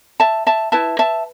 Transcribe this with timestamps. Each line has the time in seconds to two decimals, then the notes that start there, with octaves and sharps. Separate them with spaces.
0.20 E5 A5
0.47 E5 A5
0.72 E4 B4 E5 A5
0.99 E5 A5